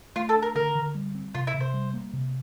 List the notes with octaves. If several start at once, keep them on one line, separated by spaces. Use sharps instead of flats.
A3 F4
A4
D4
A#4
D3 A#4
D3
G3
C4
C3 F4
E4
C3
C5
G3
A#3
C3